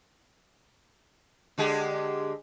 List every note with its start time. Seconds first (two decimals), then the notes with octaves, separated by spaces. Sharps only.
1.58 D3 G#3 G4